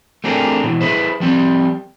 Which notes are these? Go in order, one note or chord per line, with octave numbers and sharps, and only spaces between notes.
A3 C4 D4 G4 G#4 A#4
B2 E3
E4 G#4 B4 C5
F3 G3 C4